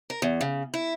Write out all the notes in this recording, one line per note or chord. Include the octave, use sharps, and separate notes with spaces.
A#4
E2
C#3
E4